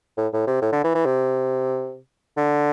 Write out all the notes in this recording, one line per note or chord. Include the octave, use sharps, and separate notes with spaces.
A2
A2
C3
A2
D3
E3
E3
C3
D3